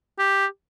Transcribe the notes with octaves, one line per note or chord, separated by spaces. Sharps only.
G4